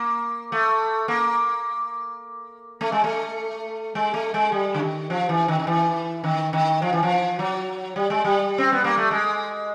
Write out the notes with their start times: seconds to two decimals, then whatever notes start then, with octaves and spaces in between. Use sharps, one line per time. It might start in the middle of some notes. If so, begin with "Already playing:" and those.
Already playing: A#3
0.52 A3
1.08 A#3
2.81 A3
2.92 G#3
3.04 A3
3.95 G#3
4.14 A3
4.34 G#3
4.52 G3
4.74 D3
4.80 D#3
5.10 F3
5.29 E3
5.48 D#3
5.60 D#3
5.67 E3
6.24 D#3
6.53 D#3
6.82 F3
6.93 E3
7.03 F3
7.39 F#3
7.96 G3
8.10 G#3
8.24 G3
8.58 C4
8.72 B3
8.84 A#3
8.97 A3
9.11 G#3